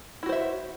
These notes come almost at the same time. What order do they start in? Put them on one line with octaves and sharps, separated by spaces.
E4 F#4 C5 E5